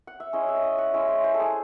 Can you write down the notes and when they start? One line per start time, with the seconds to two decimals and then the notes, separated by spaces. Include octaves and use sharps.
0.07 F#5
0.20 E5
0.33 G#3 C#4 E4 D#5
0.49 E5
0.55 D#5
0.63 E5
0.78 F#5
0.94 G#3 C#4 E4 E5
1.09 C5
1.24 C5
1.34 A4
1.40 G#4